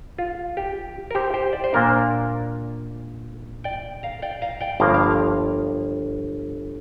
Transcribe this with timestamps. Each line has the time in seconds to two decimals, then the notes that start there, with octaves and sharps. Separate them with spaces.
0.18 F4
0.57 G4
1.11 A#4
1.15 G4 C5
1.34 G4 C5
1.53 D5
1.64 C5
1.73 A#2 A#3 D4 A#4 D5
3.64 D5 G5
4.03 F5 A#5
4.22 D5 G5
4.42 F5 A#5
4.61 D5 G5
4.80 G1 G2 F3 A#3 F5 A#5
4.94 F5